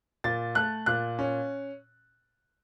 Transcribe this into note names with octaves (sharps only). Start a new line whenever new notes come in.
A#2 A6
A3 F#6
A#2 F#6
C#4